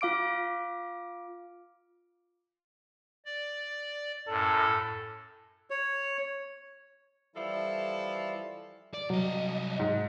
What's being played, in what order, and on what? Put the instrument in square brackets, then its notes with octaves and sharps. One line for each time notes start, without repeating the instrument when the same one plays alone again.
[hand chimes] F4 F5 D6 D7
[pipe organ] D5
[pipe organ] F#2 A2 [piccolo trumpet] A4
[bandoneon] C#5
[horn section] E3 F3 A4 [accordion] G3 E4
[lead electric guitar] D5
[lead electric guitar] C2 D#5 [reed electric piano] F#3
[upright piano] G#2